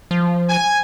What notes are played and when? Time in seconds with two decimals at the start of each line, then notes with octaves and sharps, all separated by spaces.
0.11 F3
0.49 G#5